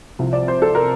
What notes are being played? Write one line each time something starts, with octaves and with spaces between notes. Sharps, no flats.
C2 C3 F3
D5
C5
A4
A#4